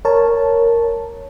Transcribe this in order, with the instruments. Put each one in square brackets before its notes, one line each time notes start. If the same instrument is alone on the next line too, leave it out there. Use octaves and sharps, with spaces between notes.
[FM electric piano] A#4 C#5 A5